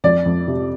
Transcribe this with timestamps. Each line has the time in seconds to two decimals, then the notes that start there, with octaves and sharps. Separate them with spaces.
0.04 F2 D5
0.26 F2
0.48 C3